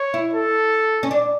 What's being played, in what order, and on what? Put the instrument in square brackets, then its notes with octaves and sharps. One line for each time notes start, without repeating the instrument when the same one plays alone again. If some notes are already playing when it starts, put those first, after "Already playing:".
Already playing: [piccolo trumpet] C#5
[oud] E4
[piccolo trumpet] A4
[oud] C#4
D4